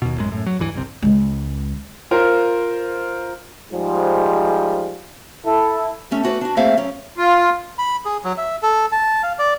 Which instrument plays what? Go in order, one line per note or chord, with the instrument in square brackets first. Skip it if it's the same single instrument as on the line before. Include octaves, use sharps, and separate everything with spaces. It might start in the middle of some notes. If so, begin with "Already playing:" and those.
[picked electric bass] D#2 B2
A1 F#2 G#3
F#2 A2
F#3
D1 G2 E3
G1 C2 C3
[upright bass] C#2 G#3
[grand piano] F4 A#4 C5
[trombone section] G#2 F3 G3 G#3
E4 A4
[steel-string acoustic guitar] G3 A3 C#4 A4
A3 F#4 B4 C#5 D5
D4 F#4
A3 A#3 C4 G#4 E5 F5
F#2 C#4
[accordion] F4
[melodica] B5
G#4
F#3
E5
A4
A5
F5
D5